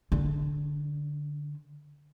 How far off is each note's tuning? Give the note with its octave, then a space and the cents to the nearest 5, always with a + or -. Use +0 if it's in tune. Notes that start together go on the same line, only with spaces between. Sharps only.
D3 +0 C#4 +40